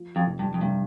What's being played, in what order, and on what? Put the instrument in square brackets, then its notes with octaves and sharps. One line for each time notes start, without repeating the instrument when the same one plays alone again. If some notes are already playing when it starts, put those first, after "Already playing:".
Already playing: [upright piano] F3
[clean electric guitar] F2
[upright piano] F1
[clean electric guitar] G2
F2
[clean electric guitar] G2 [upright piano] C3